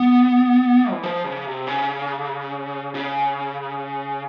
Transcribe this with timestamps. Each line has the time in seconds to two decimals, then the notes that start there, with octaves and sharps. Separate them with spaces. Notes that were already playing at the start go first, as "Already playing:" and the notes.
Already playing: B3
0.92 E3
1.04 F3
1.24 C#3
1.46 C3
1.67 C#3
2.95 C#3